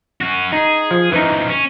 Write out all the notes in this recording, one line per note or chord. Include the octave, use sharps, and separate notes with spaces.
C#4 F#4
D#4 G#4
F3
F#2 E3 F3 D#4
C#4